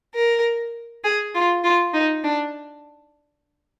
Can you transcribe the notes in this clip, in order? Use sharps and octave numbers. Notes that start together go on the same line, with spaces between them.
A#4
G#4
F4
F4
D#4
D4